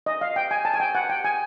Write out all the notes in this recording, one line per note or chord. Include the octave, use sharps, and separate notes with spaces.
D#5
F5
G5
G#5
A5
G#5
G5
F#5
G5
G#5